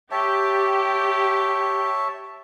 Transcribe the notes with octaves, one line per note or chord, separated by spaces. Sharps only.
G4 C#5 E5 A5